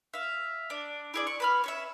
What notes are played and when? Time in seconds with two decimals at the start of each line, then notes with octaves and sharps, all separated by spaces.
0.14 E5 F5
0.70 D4
1.14 E4 G#4 D5
1.27 C#6
1.40 B4 B5 F6
1.64 C#4 C#5 E5